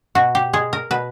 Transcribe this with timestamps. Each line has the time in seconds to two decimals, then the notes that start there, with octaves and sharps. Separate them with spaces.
0.15 B2 F#4
0.35 G4
0.53 G#3 G#4
0.73 A#4
0.91 B2 B4